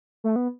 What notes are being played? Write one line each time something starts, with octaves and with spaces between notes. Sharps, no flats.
A3
B3